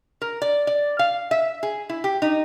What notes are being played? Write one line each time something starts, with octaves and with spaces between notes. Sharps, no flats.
A#4
D5
D5
F5
E5
G#4
E4
G4
D#4